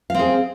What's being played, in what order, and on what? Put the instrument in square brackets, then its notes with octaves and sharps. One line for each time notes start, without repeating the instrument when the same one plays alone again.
[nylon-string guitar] F5
C4
G#4